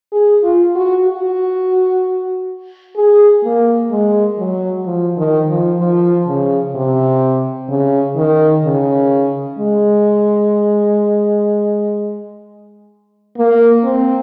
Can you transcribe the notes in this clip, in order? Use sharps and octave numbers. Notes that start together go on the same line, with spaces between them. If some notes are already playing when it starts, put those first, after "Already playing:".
G#4
F4
F#4
F#4
G#4
A#3
G#3
F#3
F3
D#3
F3
F3
C#3
C3
C#3
D#3
C#3
G#3
A#3
C4